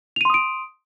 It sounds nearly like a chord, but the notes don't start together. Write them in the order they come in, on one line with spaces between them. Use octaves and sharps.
F7 D#7 C6 D#6 D7